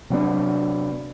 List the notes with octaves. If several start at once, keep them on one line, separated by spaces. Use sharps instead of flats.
C3 F#3 B3 D4